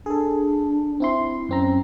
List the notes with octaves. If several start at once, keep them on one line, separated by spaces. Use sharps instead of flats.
D4 G#4 A4
C4 E4 C6
F#2 C4 C#4 A#5